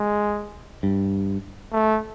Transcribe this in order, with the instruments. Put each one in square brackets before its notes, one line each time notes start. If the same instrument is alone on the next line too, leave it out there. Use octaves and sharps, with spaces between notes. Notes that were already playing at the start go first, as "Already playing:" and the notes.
Already playing: [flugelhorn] G#3
[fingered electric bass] G2
[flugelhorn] A3